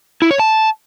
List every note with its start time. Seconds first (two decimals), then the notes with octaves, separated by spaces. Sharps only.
0.22 E4
0.31 C#5
0.39 A5